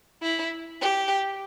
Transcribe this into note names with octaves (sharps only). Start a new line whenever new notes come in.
E4
G4